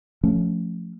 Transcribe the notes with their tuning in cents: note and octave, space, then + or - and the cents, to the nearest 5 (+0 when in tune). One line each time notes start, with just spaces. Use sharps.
F3 +0 A3 +0 C#4 +0